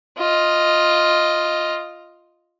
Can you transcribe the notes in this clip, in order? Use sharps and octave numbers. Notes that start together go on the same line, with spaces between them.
F4 D#5